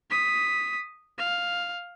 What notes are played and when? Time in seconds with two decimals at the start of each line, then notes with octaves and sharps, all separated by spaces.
0.10 D#6 B6
1.18 F5